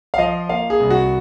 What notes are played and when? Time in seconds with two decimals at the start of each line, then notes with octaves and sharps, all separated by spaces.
0.14 F5
0.18 F3 D#5
0.49 A#3 F5
0.70 G#4
0.80 C2
0.90 F#4